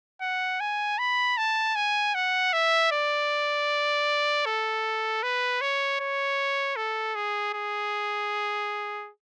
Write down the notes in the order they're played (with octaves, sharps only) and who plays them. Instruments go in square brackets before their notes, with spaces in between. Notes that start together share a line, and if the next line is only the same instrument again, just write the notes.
[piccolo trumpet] F#5
G#5
B5
A5
G#5
F#5
E5
D5
A4
B4
C#5
C#5
A4
G#4
G#4